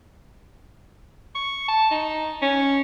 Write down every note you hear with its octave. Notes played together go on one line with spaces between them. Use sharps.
C#6
A5
D#4
C#4